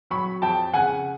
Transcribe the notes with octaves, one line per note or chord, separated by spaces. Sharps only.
F#3 B5 C#6
F2 G5 A5
C#3 F#5 G#5